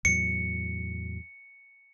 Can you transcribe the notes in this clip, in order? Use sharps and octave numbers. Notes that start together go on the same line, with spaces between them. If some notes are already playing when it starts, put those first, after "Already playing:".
E2 A2 F#3 C#7